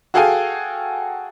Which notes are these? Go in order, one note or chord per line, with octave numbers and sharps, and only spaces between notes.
F#4 G#4 A4 F5 G5 G#5